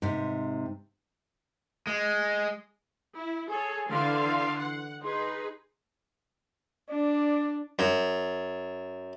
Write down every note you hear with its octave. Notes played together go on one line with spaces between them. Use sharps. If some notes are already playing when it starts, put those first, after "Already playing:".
G#2 C3
G#3
E4
G#4 A4 C#5
D3 E3 F5 C6
F#5
D#4 G#4 B4 C6
D4 D5
F#2